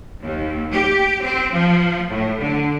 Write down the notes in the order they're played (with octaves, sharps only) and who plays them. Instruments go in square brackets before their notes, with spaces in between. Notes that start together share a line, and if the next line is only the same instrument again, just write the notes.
[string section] D#2
G4
C4
F3
A2
D3